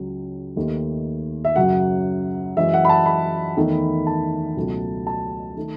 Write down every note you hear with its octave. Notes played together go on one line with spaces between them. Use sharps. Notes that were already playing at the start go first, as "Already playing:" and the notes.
Already playing: C#2 C#3 F#3
D#2 D#3 A3
E5
F#2 C#3 F#3 F#5
F#2 E3 G#3 E5
F#5
B5
A5
B5
E2 D#3 A3
A5
C#2 B2 F#3 A3
A5
D#3 A3